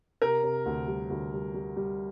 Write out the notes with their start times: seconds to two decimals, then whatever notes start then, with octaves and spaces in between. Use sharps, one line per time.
0.22 C3 A#4
0.43 C3
0.66 D2
0.87 G3
1.10 D2
1.33 G3
1.54 G3
1.76 G3